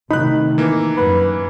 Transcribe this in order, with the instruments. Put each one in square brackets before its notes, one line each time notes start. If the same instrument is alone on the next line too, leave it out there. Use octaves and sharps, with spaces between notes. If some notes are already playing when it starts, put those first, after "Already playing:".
[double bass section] C3 D#3 A3 [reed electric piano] D#4 [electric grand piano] B5 F#6
[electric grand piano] E3 A#3
[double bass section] F#2 [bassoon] B4